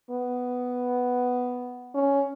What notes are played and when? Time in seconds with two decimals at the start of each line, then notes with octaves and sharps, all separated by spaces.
0.11 B3
1.94 C#4